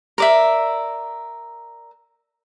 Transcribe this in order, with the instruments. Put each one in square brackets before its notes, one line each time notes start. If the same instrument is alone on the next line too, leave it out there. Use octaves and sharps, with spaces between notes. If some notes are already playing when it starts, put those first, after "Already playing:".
[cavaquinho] A#4 D5 E5